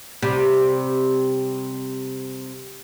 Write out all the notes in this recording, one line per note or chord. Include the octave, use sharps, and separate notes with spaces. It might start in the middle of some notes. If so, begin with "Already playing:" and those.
C3 G3